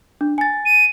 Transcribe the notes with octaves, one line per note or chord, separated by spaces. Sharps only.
D4
G#5 A6
D#7